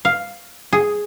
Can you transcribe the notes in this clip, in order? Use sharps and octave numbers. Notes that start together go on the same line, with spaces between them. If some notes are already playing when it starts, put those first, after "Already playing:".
F5
G#4